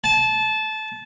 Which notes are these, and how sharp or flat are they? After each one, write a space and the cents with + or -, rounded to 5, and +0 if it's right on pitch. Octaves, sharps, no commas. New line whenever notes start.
A5 -20